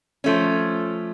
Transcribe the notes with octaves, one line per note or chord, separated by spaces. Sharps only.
F3 A3 C#4